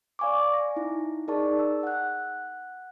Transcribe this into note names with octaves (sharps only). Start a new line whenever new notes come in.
D5 F5 G#5 C#6 D6
A#6
D#4 E4
D#4 G#4 A#4 D5 A5 C#6
E6
F#5 F#6